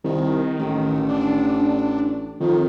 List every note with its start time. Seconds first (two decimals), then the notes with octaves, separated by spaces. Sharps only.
0.04 C2 D#3
0.59 A1
1.08 D4
2.41 F2 D#3